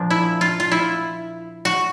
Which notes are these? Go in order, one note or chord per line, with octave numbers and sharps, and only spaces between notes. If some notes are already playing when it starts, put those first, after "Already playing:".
Already playing: A#2 F3 A#3 D4
E4
F4
F4
E4
F#4